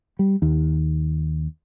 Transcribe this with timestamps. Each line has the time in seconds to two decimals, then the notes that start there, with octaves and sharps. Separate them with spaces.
0.19 G3
0.42 D#2